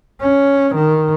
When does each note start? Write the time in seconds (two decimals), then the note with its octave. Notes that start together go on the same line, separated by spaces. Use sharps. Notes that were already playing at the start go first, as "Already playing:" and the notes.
0.21 C#4
0.75 D#3